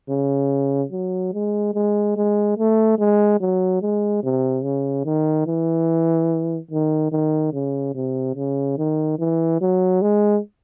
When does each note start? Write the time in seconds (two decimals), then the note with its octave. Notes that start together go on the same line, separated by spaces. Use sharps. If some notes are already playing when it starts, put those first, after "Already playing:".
0.09 C#3
0.91 F#3
1.33 G#3
1.75 G#3
2.17 G#3
2.58 A3
2.99 G#3
3.40 F#3
3.82 G#3
4.23 C3
4.64 C#3
5.05 D#3
5.47 E3
6.71 D#3
7.12 D#3
7.53 C#3
7.95 C3
8.36 C#3
8.78 D#3
9.19 E3
9.61 F#3
10.02 G#3